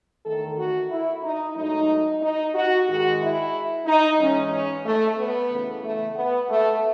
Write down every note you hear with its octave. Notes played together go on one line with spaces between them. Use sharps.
E2 D#3 A3 A4
F#4
E4
D#4
G#2 F#3 A3 D#4
D#4
F#4
G#2 D#3 G#3 F#4
E4
D#4
G#2 E3 G#3 C#4
C#4
A3
B3
F#2 C#3 E3 A3
A3
B3
A3